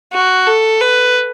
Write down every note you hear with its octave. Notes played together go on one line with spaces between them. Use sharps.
F#4
A4
B4